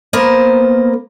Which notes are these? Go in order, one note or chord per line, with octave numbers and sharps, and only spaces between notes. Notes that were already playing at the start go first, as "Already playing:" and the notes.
A#3 B3 A#4 C5